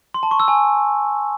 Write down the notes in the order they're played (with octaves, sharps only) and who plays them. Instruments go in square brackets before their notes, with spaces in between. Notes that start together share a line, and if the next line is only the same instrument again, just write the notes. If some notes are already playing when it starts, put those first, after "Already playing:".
[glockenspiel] C6
A5
C#6
E6
G#5